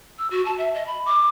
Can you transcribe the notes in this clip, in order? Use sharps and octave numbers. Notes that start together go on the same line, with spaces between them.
E6
F#4
A5
E5
D#5
B5
D6